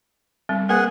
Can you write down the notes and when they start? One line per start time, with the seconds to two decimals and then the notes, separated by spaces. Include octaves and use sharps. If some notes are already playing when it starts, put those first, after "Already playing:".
0.49 G3 C4
0.69 A#3 G#4 A#4 B4 F#5 G#5